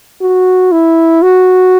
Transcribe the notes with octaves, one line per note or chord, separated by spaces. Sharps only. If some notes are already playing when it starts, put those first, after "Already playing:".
F#4
E4
F#4